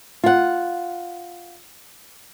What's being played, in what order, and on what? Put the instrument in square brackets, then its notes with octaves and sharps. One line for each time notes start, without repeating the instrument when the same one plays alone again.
[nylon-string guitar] F4 F#5